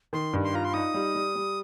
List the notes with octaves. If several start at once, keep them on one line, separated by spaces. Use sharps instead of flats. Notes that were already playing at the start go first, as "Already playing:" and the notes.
D#3 C6
G2
C6
F4 A#5
C6
D#4 D#6
G3
G3
G3